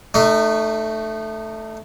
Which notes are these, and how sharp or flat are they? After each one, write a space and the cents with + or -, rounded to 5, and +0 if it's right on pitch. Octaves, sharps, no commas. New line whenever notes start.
A3 +0 D#4 -35 C#6 +15